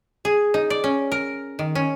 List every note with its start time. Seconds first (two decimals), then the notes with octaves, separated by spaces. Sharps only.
0.25 G#4
0.54 D#4
0.70 D5
0.84 C#4
1.12 A#4
1.59 D#3
1.75 C#4